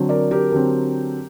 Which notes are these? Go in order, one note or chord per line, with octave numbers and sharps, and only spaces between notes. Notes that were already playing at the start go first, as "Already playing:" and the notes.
Already playing: D3 F#3 C4
A#4 D5
G4 A#4
D3 F#3 C4